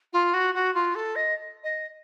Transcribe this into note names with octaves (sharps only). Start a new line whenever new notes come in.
F4
F#4
F#4
F4
A4
D#5
D#5